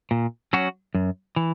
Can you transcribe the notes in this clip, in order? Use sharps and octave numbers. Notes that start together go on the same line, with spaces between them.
A#2
F#3 C#4 F#4
F#2
E3